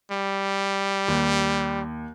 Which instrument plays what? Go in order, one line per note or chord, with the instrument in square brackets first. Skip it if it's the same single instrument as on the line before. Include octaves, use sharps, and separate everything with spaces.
[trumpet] G3
[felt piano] D#2